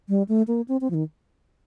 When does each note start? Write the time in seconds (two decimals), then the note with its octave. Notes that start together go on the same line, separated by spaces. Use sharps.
0.09 G3
0.29 A3
0.48 A#3
0.68 C4
0.81 C4
0.90 F3
0.94 D#3